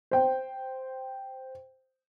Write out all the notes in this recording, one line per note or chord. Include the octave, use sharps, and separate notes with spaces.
C5 G5